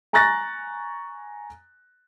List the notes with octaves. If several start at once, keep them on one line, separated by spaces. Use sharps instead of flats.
G#5 A#5 C#6 F#6 A6 A#6